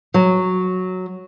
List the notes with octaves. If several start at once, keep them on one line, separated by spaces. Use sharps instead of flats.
F#3